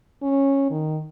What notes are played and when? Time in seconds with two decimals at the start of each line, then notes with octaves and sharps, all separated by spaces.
0.22 C#4
0.70 D#3